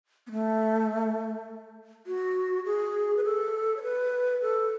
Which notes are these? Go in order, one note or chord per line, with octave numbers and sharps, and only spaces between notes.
B3
A3
F#4
G#4
B4
A4
C#5
B4
A4